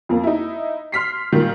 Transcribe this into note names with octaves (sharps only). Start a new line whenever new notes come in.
F2 A#3
D#4 E4
C6 F6 B6 C7
A#2 D#3 G3